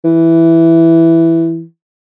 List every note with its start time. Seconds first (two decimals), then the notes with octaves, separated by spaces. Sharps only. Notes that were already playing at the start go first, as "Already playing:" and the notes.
0.04 E3